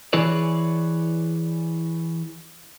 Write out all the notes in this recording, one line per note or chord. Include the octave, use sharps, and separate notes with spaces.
E3 E4 G#4 B4 C#5 D5